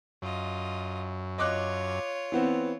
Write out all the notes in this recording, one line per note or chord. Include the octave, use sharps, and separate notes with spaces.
F#2 F4 D#5
F4 C#5 D#5 D6 F#6
E3 B3 C4